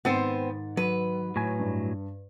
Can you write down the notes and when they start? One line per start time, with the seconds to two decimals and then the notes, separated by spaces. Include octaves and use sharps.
0.05 G#2 D#3 B3 C4 C5 A6
0.77 F#3 B4
1.36 A2 F#3 G#5
1.59 G2